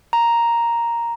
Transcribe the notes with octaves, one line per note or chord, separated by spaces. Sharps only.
A#5